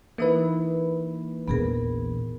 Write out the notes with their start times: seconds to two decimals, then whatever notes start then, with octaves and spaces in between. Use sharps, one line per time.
0.18 E3 A#3 D#4 E4 B4
1.48 A#1 E2 B3 G#4 A#4